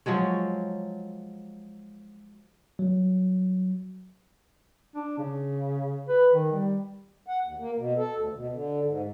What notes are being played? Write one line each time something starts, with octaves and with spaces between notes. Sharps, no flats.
F3 F#3 G#3 C#5
F#3
D4
C#3
B4
D#3
G3
F#5
D#2
A#3
B2
A4
D2
B2
D3
G#2